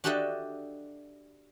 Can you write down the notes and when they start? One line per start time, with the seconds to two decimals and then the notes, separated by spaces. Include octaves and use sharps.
0.04 D4 F#4 G4 A4 D#5 E5